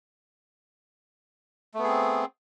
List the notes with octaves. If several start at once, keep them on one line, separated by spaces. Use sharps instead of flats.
A3 B3 C4 G#4